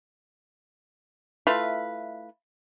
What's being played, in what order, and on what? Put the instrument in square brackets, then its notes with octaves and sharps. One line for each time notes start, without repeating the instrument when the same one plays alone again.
[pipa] A3 E4 F4 B4